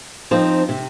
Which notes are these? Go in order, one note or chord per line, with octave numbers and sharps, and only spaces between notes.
F3 C4 D#4
C3